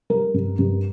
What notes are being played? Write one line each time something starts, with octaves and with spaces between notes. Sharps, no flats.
G3 A#4
G2
G2